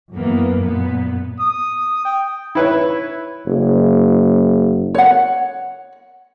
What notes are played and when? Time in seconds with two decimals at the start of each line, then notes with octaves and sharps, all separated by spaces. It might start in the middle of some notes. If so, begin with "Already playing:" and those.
0.14 F#2 E3 A#3 B3
0.61 F#2 A#2 B3
1.40 D#6
2.05 G5
2.55 E4 B4 C#5
3.46 F#1
4.95 C#5 F#5